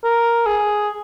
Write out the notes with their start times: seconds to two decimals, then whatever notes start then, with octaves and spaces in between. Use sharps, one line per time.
0.04 A#4
0.46 G#4